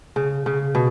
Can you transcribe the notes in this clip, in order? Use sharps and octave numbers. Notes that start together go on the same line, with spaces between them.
C#3
C#3
B2